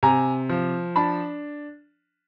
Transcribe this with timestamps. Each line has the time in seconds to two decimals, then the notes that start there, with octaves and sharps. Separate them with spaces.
0.03 C3 G#5 A#5
0.49 F3
0.96 D4 A5 B5